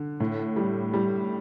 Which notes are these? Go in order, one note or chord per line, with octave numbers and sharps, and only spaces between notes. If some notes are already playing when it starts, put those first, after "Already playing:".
Already playing: D3
A2
G3
G3